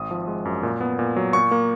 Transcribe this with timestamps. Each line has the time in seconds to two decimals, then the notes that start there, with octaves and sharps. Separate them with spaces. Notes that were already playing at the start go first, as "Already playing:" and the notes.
Already playing: G#1 D#6
0.11 F3
0.28 G#3
0.45 F#2
0.63 A#2
0.80 B3
0.99 A#2
1.16 F#3
1.33 A#2 C#6
1.51 A#3